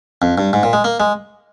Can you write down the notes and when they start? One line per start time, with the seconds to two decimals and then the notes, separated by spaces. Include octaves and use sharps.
0.22 F2
0.38 G2
0.53 G#2
0.63 A#2
0.73 G#3
0.84 A#3
1.00 G#3